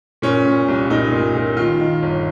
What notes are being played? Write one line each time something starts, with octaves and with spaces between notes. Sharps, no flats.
A#2 C#4
A#2
C2
A#2 D#4
A#2
A#2
D#3 F4
D#3
G1